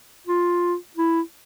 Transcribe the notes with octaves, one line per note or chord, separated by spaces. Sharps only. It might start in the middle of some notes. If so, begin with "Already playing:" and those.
F4
E4